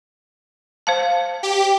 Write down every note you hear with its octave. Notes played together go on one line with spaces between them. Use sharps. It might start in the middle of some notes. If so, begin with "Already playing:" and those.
C5 F5 A5
G4